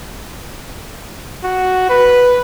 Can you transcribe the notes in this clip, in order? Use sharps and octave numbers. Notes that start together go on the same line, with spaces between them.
F#4
B4